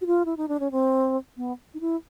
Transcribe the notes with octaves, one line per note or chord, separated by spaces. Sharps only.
F#4
F4
E4
D#4
D4
C#4
C4
B3
D#4
E4